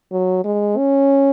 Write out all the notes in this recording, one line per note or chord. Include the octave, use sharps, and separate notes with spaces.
F#3
G#3
C#4